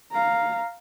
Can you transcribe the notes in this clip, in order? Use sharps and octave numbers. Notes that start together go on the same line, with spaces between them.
F5 A#5